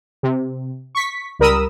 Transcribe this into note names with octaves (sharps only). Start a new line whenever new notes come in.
C3
C#6 B6
C#2 G3 A#4 B5 D#6 E6